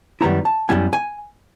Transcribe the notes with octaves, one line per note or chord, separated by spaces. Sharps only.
F#2 D#3 G3 B3 E4 A#5
A5
F#2 D#3 G3 B3 E4 G#5
G#5